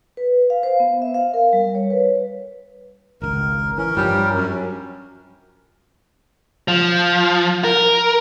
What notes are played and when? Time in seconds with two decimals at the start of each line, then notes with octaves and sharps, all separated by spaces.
0.17 B4
0.50 F5
0.63 C5
0.80 B3
1.02 E5
1.14 F5
1.34 A#4
1.53 G3
1.75 C#5
1.90 B4
3.22 G#1 C#2 A#4
3.78 E3 C#4 A#4
3.97 G2 F3 G3
4.34 F#2
6.68 F3
7.64 A#4